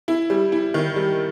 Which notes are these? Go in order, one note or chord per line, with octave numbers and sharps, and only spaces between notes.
E4
G3
E4
D#3
G3